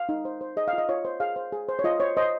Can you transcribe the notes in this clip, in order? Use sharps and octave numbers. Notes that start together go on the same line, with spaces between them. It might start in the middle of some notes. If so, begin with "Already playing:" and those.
Already playing: F5
D#4
C5
C5
G#4 D#5
F5
F4
D#5
F4 C#5
C5
G#4 F5
C5
G#4
C5
C#5
F4 D#5
C5 C#5
C5 D#5